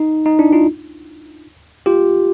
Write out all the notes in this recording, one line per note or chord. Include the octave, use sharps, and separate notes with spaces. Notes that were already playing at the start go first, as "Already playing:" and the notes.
Already playing: D#4
D#4
D4 E4
D#4 F4
F4 G4